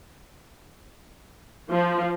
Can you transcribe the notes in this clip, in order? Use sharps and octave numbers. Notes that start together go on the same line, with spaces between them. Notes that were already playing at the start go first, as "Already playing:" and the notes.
F3